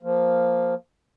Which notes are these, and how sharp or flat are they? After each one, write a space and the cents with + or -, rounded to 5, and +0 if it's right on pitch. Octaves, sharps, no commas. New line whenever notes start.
F3 +0 A#3 +0